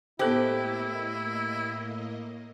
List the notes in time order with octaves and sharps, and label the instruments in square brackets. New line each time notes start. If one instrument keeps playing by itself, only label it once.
[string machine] A2 A#3 D#5 [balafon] B3 A4 C5 [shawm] E4 [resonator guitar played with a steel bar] G4